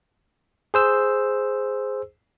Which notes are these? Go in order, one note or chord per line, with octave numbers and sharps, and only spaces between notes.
G#4 C5 E6